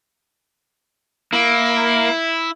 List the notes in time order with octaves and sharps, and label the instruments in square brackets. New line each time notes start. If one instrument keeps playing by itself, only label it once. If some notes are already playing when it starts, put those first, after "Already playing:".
[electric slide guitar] A#3 [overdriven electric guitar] E4